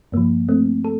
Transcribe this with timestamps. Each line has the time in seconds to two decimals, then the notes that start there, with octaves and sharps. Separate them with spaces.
0.12 G2 F3 A#3
0.49 A3 C4
0.85 A4